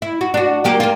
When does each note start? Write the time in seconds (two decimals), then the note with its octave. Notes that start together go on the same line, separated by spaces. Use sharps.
0.02 E4
0.21 F#4
0.34 D4 F#4
0.64 F#3 A#3 G4
0.80 A#3 F4